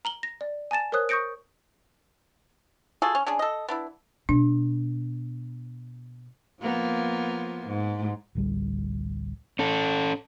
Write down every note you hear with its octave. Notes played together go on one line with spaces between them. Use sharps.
A#5 F#7 G7
A#6
D5
G#5 A5 A6 E7
A#4 C5 C#5 D#6 F#6
C#6 D#6 G6 A#6 C#7 D7
F4 F#4 G#4 A4
C#4
C#4 D4 G#4
A4 D#5
B3 D4 E4
B2 D4
F3 A#3 B3
G#2
A1 D2 G3
C#4 A4